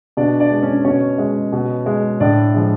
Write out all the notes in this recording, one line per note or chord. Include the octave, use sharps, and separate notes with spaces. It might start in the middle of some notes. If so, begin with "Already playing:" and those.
B2 D4 D5
D4 D5
G#3
C#4 C#5
B2 C#4 C#5
G#3
B2
G#3
A2 D4 D5
F3 G#3